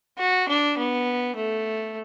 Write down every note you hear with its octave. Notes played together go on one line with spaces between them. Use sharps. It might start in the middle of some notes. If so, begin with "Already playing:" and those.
F#4
D4
B3
A3